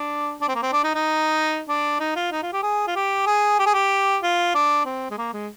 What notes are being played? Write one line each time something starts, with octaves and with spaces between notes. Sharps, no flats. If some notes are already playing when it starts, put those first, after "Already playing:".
Already playing: D4
D4
C4
A#3
C4
D4
D#4
D#4
D4
D#4
F4
D#4
F4
G4
G#4
F4
G4
G#4
G4
G#4
G4
F4
D4
C4
G#3
A#3
G#3